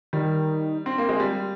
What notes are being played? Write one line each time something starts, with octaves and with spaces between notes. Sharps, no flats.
D#3 G3
C4
A#3
G#3
G3